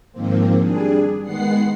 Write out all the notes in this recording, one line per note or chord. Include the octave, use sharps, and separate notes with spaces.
G#2 D#3 F3 A#3 C4
G3 D4 G#4
D#3 G#3 B3 F#5 C7